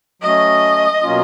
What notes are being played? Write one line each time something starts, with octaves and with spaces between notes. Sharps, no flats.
F#3 A3 C#4 D#5
B2 F#3 A#3 C#4 F4